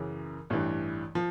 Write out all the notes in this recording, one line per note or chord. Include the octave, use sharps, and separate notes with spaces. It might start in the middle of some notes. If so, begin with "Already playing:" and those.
Already playing: F#2 C#3 E3
A1 G2 E3
F3